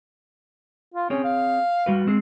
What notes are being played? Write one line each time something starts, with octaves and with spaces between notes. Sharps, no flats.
F4
C4 C#4 G#4 C#5
F5
G3 F#4 B4
G#3 C4 G#4